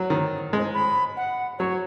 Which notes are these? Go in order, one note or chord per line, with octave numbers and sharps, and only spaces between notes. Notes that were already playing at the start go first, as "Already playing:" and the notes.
Already playing: F#3
D#3
G#3
B5
F#5
F#3 C#5